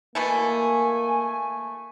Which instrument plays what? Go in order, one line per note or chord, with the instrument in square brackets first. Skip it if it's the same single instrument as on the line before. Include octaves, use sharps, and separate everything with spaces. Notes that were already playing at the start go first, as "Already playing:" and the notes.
[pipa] B2 E3 A3 [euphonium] A#3 [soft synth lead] G#5